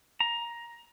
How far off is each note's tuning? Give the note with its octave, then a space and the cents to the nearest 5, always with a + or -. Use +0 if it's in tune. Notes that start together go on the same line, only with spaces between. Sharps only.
A#5 +15